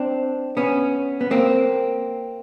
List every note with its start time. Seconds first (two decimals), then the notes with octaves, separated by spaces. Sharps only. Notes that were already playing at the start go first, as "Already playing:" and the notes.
Already playing: C4 D4
0.57 B3 C#4
1.21 B3
1.31 A#3 C4